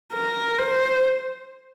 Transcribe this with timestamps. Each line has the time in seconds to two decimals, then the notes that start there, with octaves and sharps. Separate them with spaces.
0.13 A#4
0.58 C5